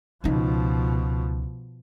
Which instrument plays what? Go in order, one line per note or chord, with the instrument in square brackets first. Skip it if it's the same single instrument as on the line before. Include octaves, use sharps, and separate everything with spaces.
[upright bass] C#2 D#4 [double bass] B2 F3